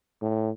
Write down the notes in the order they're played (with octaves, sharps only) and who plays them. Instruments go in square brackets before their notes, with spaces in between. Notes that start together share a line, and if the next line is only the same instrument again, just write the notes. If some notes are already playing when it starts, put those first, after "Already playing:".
[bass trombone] A2